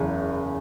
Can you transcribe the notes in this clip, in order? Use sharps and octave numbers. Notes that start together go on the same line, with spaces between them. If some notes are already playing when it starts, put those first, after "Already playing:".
Already playing: F#1 E2 C#3